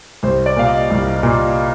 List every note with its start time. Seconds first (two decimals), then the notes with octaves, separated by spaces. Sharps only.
0.23 C2 C5
0.46 D5
0.56 A#2 F5
0.68 D#5
0.91 C2
1.23 A#2